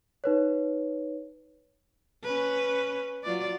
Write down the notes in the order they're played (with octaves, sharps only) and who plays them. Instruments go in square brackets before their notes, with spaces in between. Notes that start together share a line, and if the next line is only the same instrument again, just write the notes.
[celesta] D#4 B4 C#5
[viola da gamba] C#4 B4
F#3 F4 D5